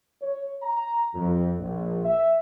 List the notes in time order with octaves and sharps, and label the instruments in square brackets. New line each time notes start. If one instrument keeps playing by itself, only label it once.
[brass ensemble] C#5
A#5
F2
A#1
E5